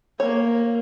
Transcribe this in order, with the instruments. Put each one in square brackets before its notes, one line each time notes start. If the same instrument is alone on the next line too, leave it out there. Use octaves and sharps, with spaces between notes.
[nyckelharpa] A#3 [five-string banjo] C#5